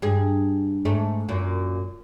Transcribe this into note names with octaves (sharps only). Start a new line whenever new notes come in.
G2 G#4
G#2 A3
F#2 A#2